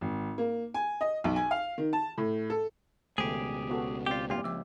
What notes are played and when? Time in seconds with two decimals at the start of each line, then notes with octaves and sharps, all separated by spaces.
0.01 G#1
0.38 A#3
0.74 G#5
1.01 D#5
1.24 B1
1.36 G#5
1.51 F5
1.78 D#3
1.93 A5
2.18 A2
2.50 A4
3.18 C#2 B2 D#3 A3 G4 G#4
3.69 B3 F#4 A4
4.06 C4 F4 G4 D5 G5
4.30 E2 G2 A#3 F4 G4
4.44 C#2 F3 D6